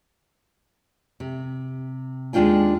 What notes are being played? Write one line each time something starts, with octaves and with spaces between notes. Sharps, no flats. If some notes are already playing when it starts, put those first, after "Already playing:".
C3
D#2 G#3 D4 F4 G5 G#5